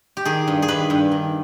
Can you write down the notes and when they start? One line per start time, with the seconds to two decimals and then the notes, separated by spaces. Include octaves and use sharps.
0.17 G4
0.25 D#3 G#4
0.48 G2
0.62 G#4
0.68 D#3 B4
0.90 G2
1.12 D#3